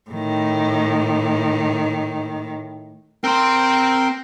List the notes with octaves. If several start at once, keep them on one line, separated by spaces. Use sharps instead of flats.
A2 D#3
C4 A#4 G5 C6